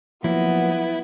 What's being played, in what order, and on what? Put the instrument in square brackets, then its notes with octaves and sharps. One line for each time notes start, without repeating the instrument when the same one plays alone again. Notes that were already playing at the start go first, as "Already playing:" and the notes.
[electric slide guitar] F3 F#3 A#3 [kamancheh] B3 [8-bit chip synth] E4